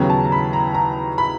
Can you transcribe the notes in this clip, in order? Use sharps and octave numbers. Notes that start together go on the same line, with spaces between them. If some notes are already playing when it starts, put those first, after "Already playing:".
Already playing: D#2 C#3 F#3 B3 A#5
A5
A#5
B5
A#5
A#5
B5